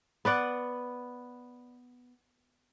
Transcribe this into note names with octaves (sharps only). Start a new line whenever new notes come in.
B3 B4 D5 F#5